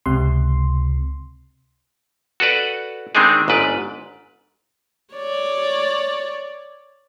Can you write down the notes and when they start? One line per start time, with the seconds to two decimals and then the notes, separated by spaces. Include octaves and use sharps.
0.06 C#2 C3 C6
2.40 F#4 A4 B4 D5
3.15 D#3 G#3 C4 D4 D#4 G#4
3.48 G1 G#2 B4 D5
5.14 C#5 D5